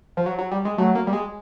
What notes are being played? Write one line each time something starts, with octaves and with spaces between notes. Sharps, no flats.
F3
F#3
F#3
G3
G#3
F#3 A3
A#3
G3
G#3